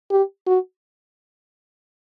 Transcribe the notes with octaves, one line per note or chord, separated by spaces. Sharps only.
G4
F#4